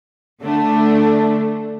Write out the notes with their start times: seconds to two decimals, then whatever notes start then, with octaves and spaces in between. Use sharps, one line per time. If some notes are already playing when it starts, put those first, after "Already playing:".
0.42 D3 A3 D4